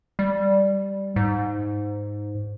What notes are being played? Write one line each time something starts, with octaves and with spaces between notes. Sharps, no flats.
G3
G#2